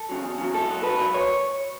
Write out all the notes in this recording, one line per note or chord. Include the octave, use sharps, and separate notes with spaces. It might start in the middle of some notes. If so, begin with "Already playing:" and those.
Already playing: A4
C#3 F#3
E2
C#3 F#3
G#2 A4
F#3
G#2 B4
F#3
C#5